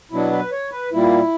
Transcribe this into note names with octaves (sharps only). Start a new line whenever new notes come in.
B2 F#3 B3 D4 E4
B4
C#5
B4
A#2 G3 A#3 E4